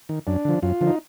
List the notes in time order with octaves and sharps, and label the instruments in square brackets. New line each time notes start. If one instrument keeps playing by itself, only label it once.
[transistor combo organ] D#3
F#2 D4
D3 F3
F#2 F4
D3 F3
D#4